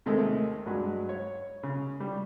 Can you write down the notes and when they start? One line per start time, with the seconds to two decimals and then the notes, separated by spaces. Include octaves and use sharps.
0.06 D#2 C3 D#3 G#3 A3
0.66 G2 F#3 G#3
1.09 C#5
1.63 C#3
2.00 G3